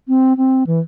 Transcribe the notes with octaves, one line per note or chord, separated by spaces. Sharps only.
C4
C4
E3